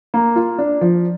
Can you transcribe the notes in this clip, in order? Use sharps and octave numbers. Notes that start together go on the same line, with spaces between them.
A#3
F4
D4
F3